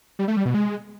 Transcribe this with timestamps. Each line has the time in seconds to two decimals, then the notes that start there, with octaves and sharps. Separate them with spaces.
0.19 G3
0.28 A3
0.37 G3
0.45 B2
0.54 G#3